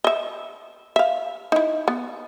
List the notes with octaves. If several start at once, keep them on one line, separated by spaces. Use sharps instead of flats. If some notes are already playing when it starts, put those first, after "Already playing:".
D#5 E5
E5 F5
D#4 E4
B3